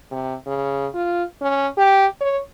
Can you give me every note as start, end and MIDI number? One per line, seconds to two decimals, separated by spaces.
0.11 0.35 48
0.46 0.87 49
0.94 1.23 65
1.41 1.68 61
1.77 2.06 67
2.21 2.40 73